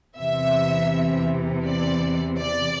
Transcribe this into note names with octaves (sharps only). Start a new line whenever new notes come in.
E2 C3 E3 E5
D5
D5